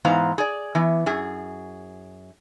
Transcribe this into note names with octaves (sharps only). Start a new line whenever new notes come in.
G#2 E3 B3 C5 F5 A#5
G#4 D5
E3 B3
F#2 G#4